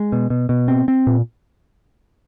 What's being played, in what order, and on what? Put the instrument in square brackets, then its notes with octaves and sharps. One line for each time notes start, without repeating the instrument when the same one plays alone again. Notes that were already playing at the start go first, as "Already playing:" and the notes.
Already playing: [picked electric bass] G#3
B2
B2
B2
C4
C4
A#2